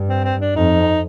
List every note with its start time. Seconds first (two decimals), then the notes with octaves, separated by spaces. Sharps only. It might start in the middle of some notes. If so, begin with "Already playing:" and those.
Already playing: G2
0.09 C4
0.24 C4
0.41 D4
0.56 F2 D#4